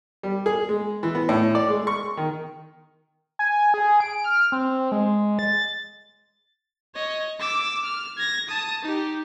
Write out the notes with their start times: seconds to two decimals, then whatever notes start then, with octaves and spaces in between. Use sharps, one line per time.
0.23 G3
0.46 G#4
0.69 G#3
1.03 E3
1.15 B3
1.29 A2
1.55 D5
1.68 G#3
1.87 C#6
2.17 D#3
3.39 G#5
3.74 G#4
4.00 D7
4.24 F6
4.52 C4
4.92 G#3
5.39 A6
6.95 C#5 D#5
7.39 D6 E6
7.85 F6
8.17 G#6 A#6
8.48 A5 D#6
8.83 D#4 G4